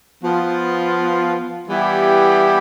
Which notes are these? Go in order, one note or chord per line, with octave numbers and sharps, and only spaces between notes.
F3 B3 F4
E3 G3 B3 E4 G4